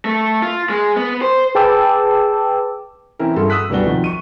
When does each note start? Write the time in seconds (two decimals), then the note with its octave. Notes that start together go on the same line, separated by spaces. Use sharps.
0.05 A3
0.42 F4
0.69 G#3
0.96 B3
1.22 C5
1.55 G#4 B4 G5 A5 D6 E6
3.19 E3 C4 C#4 E4 A#4
3.36 G2 E4 F#4 G#4 A4 C6
3.50 D#6 E6 F#6 B6
3.70 D1 G3 B3 D4 F#4 G7
3.87 C3 D#3 F3
4.04 C#6 D#7